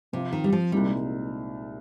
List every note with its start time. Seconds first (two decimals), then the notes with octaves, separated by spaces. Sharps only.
0.13 C3 F3 C4 F4
0.33 D#3
0.44 G3
0.52 F3
0.72 C2 A#2 G3 G#3 C4 D#4